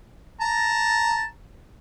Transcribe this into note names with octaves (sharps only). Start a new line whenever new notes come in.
A5 A#5